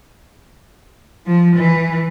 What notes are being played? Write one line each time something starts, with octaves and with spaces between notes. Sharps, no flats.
F3
E3